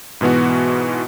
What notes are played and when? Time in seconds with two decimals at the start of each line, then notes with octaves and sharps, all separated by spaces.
0.21 G#2 B2 E3 B3 F#4